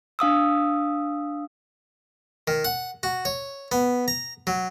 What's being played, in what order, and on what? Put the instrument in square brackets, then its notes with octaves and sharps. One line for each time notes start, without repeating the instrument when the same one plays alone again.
[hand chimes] D4 F5 D#6 E6
[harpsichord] D#3
F#5
F#4
C#5
B3
A#5
F#3